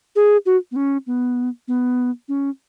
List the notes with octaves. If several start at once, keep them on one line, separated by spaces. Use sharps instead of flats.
G#4
F#4
B3
C#4
B3
B3
C#4